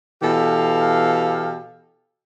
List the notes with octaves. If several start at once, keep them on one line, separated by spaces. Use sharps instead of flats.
B2 E3 G4 A4 F5